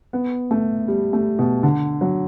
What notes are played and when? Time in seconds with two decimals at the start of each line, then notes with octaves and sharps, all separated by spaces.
0.13 B3
0.51 A3
0.88 G3
1.13 A3
1.39 B2
1.63 D3
2.01 F#3